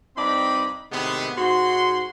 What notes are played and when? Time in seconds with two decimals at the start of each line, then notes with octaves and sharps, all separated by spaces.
0.17 G2 C4 D#4 D5 D#5 B5
0.92 A2 C3 D#3 G#3 B3
1.37 G#2 F#4 C6